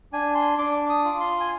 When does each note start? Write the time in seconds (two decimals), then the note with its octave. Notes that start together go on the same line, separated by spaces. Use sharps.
0.13 D4 G#5
0.35 C6
0.58 D4 D6
0.90 D#6
1.05 F4
1.20 C6
1.41 G#5